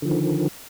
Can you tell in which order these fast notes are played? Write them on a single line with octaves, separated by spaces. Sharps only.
D3 F3 D#3